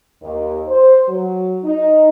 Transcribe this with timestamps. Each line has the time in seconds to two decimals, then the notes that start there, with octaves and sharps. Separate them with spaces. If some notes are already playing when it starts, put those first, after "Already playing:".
0.22 D#2
0.68 C5
1.08 F#3
1.64 D#4